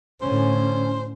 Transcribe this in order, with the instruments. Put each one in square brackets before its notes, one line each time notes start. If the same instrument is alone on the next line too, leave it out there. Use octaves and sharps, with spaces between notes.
[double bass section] A2 D3 C#4 [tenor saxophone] C5